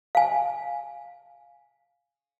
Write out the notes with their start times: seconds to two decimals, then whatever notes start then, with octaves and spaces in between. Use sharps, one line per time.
0.15 F5 G#5